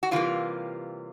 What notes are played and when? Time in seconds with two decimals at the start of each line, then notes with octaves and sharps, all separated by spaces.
0.03 F#4
0.11 C3 E3 G3 A#3 F4